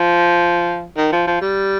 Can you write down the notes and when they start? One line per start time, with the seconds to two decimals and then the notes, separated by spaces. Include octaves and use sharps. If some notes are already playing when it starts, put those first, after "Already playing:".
Already playing: F3
0.97 D#3
1.12 F3
1.27 F3
1.41 G3